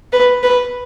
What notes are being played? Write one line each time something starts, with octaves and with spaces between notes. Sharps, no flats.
B4
B4